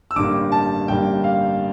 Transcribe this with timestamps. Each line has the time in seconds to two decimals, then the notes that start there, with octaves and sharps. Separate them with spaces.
0.11 E6
0.16 A1 G2 D3 G3 A#3 D6
0.52 A5
0.88 A1 G2 D3 G3 A#3 G5
1.24 F5